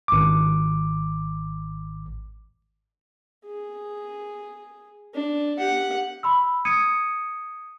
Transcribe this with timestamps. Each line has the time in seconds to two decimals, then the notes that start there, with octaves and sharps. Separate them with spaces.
0.08 G#1 D6
3.46 G#4
5.14 D4
5.58 G4 F#5
6.23 B5 C6 E6
6.65 D#6 G#6 C#7 D#7